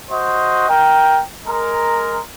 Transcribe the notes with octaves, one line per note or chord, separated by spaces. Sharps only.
F#4 C5 D#5
A#4 G5
G#3 A#4